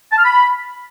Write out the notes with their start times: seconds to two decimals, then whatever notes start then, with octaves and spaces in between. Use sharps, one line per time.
0.11 A5
0.18 F6
0.24 B5